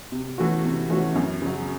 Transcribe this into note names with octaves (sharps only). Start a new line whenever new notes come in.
C3
E3 A3 C#4 F#4
C3
E3 A3 C#4 F#4
F#2
C#3 F#3